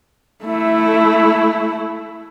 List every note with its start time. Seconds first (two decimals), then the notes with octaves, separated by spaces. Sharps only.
0.44 A3 E4